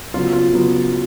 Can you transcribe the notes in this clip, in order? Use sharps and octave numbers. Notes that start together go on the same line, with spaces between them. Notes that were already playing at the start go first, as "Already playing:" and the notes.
C#3 F#3 B3 F4
F4
C#3 F#3 B3